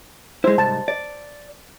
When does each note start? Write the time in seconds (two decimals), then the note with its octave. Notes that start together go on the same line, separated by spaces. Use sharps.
0.44 G#3 E4 C5
0.58 C2 G#2 A5
0.88 D5